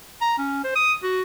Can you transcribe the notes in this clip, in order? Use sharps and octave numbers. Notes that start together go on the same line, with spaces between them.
A#5
C#4
C5
D#6
F#4